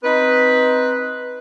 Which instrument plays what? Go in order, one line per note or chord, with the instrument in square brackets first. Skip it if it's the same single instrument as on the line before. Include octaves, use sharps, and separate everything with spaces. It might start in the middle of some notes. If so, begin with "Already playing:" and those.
[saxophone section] C4 D#4 B4